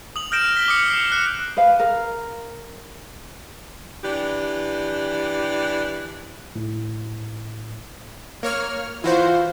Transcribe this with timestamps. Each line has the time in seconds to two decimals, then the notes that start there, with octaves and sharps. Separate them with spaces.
0.16 D#6 F#7
0.32 F6 G6 A#6 D7 E7
0.56 B6 G7
0.68 D6 D#6 C#7
0.90 C7 C#7
1.12 F#6 C#7
1.57 B4 F5
1.79 A#4
4.03 E3 D4 G4
6.56 A2
8.43 A#3 C#5 F6
9.04 E3 F4 F#4 C5